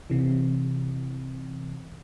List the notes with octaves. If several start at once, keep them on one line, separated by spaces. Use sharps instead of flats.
C3 E3